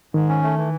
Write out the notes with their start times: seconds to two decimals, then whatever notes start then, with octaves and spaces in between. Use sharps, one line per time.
0.14 G#2 D#3
0.29 C#4
0.43 A3
0.58 E3